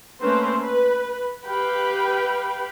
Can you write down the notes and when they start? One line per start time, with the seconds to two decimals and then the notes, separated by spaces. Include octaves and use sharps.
0.21 A3 A#3 C4 C#4 B4 C5
0.61 B4
1.45 G4 B4 F5 G5 B5